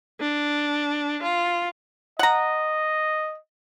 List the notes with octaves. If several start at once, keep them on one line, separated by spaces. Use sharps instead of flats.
D4
F4
D#5 F#5 A#5